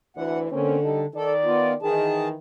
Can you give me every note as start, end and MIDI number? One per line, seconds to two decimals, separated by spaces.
0.17 0.46 38
0.17 0.46 52
0.17 0.40 78
0.52 1.06 50
0.52 0.78 58
0.52 0.78 60
0.52 0.78 61
0.83 1.03 55
0.83 1.03 63
0.83 1.03 69
1.15 1.75 51
1.15 1.33 69
1.15 1.75 74
1.45 1.74 59
1.45 1.74 65
1.82 2.35 51
1.82 2.35 52
1.82 2.28 68
1.82 2.28 81